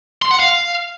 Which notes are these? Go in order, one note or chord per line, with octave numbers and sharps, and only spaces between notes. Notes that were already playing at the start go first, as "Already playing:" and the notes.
C6
F#5
F5